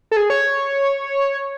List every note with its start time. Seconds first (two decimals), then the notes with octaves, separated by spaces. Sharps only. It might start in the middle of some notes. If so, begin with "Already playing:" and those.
0.11 A4
0.17 G#4
0.30 C#5